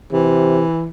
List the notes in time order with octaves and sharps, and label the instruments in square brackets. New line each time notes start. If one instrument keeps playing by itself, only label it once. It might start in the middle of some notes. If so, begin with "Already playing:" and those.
[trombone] C3 [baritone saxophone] E3